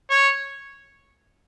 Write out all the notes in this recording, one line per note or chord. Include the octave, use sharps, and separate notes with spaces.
C#5